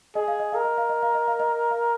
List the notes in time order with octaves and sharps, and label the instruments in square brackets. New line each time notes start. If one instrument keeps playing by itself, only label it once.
[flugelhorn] G#4 [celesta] D#5
[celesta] F5
D#5
[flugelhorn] A#4 [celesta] F5
[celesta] D#5
F5
D#5
F5
D#5
F5
D#5
F5